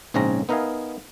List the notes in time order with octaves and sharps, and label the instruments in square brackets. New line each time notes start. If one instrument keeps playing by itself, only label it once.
[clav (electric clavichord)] A#1 G#2 C#3 C4 C#4 A#5
B3 D#4 A#4 E5 F5 G#5